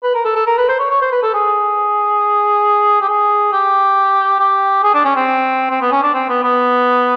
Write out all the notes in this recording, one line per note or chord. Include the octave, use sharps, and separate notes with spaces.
B4
A#4
A4
A4
A#4
B4
C5
C#5
C#5
C5
B4
A4
G#4
G4
G#4
G4
G4
G#4
D4
C#4
C4
C4
B3
C#4
D4
C4
B3
B3